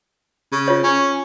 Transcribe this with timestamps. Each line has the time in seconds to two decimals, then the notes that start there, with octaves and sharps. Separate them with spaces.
0.52 C#3
0.68 F4 C#5
0.84 C#4